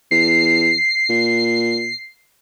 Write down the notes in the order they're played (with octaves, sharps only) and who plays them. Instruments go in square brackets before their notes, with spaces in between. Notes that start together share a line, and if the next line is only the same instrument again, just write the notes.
[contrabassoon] E2 [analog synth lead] C7
[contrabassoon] A#2